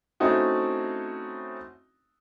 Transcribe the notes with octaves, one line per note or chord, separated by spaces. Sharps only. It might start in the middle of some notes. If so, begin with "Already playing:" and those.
A3 C4 C#4 D#4 E4 F#4